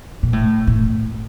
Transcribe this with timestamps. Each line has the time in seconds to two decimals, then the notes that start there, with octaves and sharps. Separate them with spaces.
0.23 A#2
0.33 A2
0.67 A2